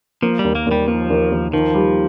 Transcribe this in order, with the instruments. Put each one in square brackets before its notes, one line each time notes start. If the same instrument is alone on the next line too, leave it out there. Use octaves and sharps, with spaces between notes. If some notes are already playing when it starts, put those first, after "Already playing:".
[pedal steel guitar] F3 [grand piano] A#3
[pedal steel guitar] G3
[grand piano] D#2
[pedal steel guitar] A#3
[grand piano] D#2
[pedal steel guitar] G3
[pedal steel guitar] F3 [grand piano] A#3
[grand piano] D#2
D#2
[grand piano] D#3 [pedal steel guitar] F3
[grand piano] G3